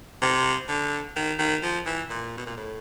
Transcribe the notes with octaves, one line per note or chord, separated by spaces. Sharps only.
C3
D3
D#3
D#3
F3
E3
A#2
B2
A#2
A2